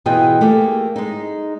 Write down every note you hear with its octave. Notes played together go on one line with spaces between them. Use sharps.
B2 E3 F4 G#4 D#5 G5
A3 A#3 G4 G#4
G#3 D#4